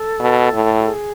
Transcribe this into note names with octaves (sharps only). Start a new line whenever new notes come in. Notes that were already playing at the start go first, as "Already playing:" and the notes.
Already playing: A4
B2
A2
F#4
G#4